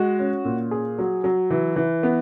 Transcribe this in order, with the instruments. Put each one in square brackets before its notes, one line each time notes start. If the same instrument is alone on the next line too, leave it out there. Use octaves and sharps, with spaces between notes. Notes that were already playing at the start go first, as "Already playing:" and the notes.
Already playing: [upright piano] G#3 F#4
C#4
A#2
G#4
F#3
F#3
E3
E3
B3